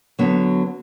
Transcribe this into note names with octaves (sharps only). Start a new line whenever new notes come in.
D3 F#3 B3